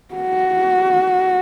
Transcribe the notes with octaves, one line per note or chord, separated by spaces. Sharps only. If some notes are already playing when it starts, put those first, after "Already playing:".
F#4